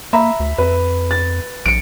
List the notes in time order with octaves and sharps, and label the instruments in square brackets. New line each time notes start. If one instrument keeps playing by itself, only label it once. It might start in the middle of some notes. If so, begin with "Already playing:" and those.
[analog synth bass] A#3 [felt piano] E5 A#5 B5
[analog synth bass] D2
[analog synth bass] F2 [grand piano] B4
[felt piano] A6
[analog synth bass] A#1 [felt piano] C#7 D7